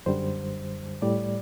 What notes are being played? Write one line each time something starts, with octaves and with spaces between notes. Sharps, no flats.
F#2 D3 G3 C5
A2 G3 D5